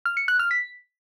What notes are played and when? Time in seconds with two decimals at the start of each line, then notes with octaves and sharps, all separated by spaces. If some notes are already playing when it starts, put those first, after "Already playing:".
0.05 F6
0.17 C#7
0.28 F#6
0.39 F6
0.51 B6